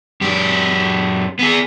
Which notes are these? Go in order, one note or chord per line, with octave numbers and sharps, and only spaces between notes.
F#2 G4
B3 G#4